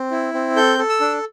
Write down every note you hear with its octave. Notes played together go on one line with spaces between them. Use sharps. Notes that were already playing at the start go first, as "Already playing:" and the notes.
Already playing: C4
E4
C4
A4 G6
A4
E6
D4